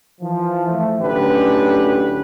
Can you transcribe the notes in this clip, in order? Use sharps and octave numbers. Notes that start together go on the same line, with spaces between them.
E3 F3
A3
B1 A2 D3 C#4 G4 B4